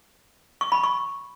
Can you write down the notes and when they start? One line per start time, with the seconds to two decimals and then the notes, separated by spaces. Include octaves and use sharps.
0.61 C#6
0.72 B5
0.84 C#6